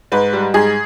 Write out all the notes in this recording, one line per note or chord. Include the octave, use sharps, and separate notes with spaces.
G#2 B4
G3
G#2 G#4